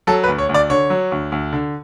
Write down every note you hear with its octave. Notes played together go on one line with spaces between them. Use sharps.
F#3 A4
B4
D2
C#5
D2
D5
D3 C#5
F#3
D2
D2
D3